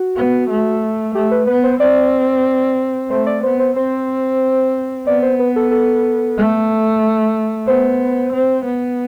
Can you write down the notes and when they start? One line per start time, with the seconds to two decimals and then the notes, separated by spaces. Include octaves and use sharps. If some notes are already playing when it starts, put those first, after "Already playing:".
Already playing: F#4
0.16 B3
0.50 A3
1.15 A3 G4
1.31 B4
1.47 B3 B4
1.63 C5
1.80 C4 D5
3.10 A3 C5
3.26 D5
3.43 B3 C5
3.60 C5
3.76 C4 C5
5.07 B3 D5
5.22 C5
5.39 B4
5.56 A4
5.71 A4
6.37 A3
7.67 B3 C5
8.33 C4
8.65 B3